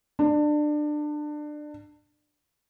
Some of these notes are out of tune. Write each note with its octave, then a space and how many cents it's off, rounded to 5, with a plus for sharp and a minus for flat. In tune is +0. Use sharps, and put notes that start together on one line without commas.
D4 +25